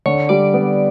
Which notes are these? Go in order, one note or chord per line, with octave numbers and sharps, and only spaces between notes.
D3 C#5
G3 D5
B3